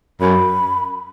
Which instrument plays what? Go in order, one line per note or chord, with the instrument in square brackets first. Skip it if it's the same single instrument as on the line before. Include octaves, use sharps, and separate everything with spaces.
[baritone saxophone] F#2 [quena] B5